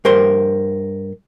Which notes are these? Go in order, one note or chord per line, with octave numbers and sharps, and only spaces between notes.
G2 A#4 C5 C6